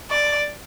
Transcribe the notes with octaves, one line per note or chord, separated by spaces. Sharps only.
D5